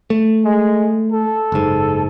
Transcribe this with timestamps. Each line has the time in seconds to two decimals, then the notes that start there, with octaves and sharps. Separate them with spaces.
0.10 A3
0.45 G#3
1.12 A4
1.52 F#1 G#2